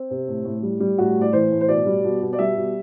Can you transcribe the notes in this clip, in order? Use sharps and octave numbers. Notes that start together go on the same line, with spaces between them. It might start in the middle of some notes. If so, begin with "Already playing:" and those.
Already playing: C4
C3
A2
A2
G3
G3
A2 F#4
A2
D5
E3 C5
A2
C5
B2 D5
G3
B2
B2
D5
G3 E5
B2